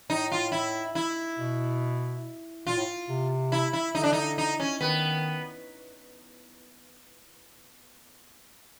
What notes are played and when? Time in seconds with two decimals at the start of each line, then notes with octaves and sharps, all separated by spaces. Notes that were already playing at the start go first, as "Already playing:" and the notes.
0.10 A2 D#4
0.32 F4
0.52 E4
0.95 E4
1.38 B2
2.67 A#2 F4
2.77 A2
3.09 C3
3.52 E4
3.73 E4
3.95 D3 D#4
4.04 D4
4.13 D#4
4.38 D#4
4.60 C#4
4.81 D#3 B3